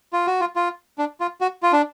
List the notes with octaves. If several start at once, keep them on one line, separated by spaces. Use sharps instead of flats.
F4
F#4
F4
F4
D4
F4
F#4
F4
D4